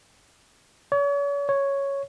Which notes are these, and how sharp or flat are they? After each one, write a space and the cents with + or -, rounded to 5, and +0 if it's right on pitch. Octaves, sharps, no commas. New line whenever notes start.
C#5 +40
C#5 +0